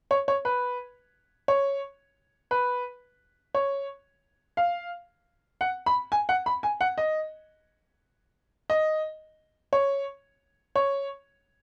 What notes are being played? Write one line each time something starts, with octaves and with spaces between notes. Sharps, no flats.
C#5
C#5
B4
C#5
B4
C#5
F5
F#5
B5
G#5
F#5
B5
G#5
F#5
D#5
D#5
C#5
C#5